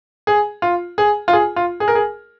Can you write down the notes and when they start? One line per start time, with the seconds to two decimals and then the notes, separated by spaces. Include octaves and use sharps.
0.27 G#4
0.62 F4
0.98 G#4
1.28 F4
1.33 G#4
1.56 F4
1.80 G#4
1.88 A#4
1.95 G#4